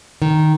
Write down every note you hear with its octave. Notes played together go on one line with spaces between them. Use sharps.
D#3